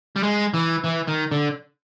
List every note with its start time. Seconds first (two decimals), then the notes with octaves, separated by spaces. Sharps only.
0.16 G3
0.23 G#3
0.54 E3
0.85 E3
1.08 D#3
1.31 D3